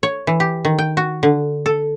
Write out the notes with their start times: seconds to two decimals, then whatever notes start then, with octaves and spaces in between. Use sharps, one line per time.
0.03 C#5
0.27 E3
0.40 G4
0.65 D#3
0.79 G5
0.97 F#4
1.23 D3
1.66 A4